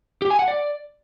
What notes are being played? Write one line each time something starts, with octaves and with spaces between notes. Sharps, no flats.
G4
G#5
F#5
D5